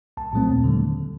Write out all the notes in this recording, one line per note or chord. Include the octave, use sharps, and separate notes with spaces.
C2 A5
A#2 F#3 A3 C4
D#2
D3 G3